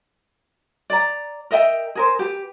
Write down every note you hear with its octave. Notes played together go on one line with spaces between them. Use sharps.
D5 A#5
A#4 D#5 E5 G5
G#4 A#4 C5
G4 B4